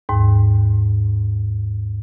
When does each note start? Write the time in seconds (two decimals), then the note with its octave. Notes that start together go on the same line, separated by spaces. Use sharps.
0.09 D#2 G#2